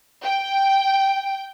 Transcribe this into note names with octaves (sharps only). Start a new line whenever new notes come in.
G5